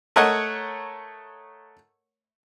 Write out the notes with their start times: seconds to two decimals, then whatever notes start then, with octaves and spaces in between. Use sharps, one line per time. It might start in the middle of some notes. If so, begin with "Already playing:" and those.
0.16 A3 A#4 C#5 D#5 F#5